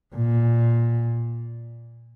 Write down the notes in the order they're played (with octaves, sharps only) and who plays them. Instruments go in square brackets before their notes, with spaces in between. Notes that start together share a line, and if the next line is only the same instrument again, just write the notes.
[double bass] A#2